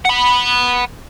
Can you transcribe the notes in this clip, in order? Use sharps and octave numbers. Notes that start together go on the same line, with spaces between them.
F#5 B5